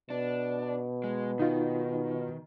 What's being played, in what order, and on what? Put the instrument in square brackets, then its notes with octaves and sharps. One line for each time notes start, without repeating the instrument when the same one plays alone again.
[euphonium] B2 [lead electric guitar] D4
[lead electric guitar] G#3
[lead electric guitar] D#3 [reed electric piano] D#4 F4